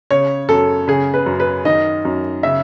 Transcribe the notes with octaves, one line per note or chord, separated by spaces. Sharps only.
C#3 C#5
F#2 A4
C#3 G#4
B4
F#2
B4
D#3 D#5
F#2
C#3 E5